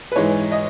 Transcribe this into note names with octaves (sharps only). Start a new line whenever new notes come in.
B4
G#2 E3 G#3 C#5
D#5